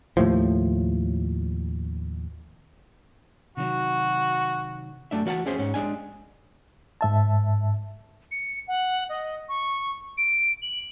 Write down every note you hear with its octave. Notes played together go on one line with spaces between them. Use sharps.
D#2 A2 F3
C3 D#3 F#3 F#4
F#2 A3 D4 E5
E3 F#4 F5 F#5 A5
E2 C#4 G#4 C5 E5
G#2 C#4
G#3 D4 G#5
G#2 E5 A5
C#7
F#5
D#5
C#6
D7
F#7